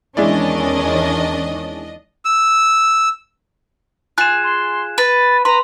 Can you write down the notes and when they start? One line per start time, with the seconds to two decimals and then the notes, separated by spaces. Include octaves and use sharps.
0.17 E2 D#3 G#3 C#4 D4 E4 D5 D#5
2.25 E6
4.18 F4 G#4 F#6 E7
4.44 C6
4.98 B4 A6
5.45 B4 A#5 C6